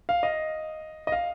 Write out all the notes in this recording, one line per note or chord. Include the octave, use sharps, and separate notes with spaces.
F5
D#5
D#5
F5